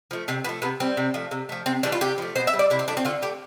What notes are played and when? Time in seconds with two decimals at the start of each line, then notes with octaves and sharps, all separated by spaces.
0.11 F3 A3
0.28 C3 C4
0.44 F3 A3 B3
0.62 C3 B3
0.80 G3 C4
0.97 C3
1.14 F3 A3
1.31 C3
1.49 F3 A3
1.66 C3 C4
1.83 E3 G3 D4
1.92 F4
2.01 C3 G4
2.18 F3 A3
2.36 B2 C5
2.47 E5
2.53 G3
2.59 D5
2.70 C3 E4
2.79 C4
2.88 F3 A3 D4
2.97 C4
3.05 D3 F4
3.22 A3 G4